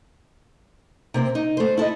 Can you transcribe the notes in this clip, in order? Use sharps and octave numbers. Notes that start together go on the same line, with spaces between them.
C3 A#3 C4
D#4
A3 C5
E4 A4 A#4 D#5